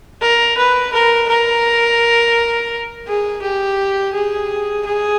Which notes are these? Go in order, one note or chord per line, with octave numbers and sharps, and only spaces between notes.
A#4
B4
A#4
A#4
G#4
G4
G#4
G#4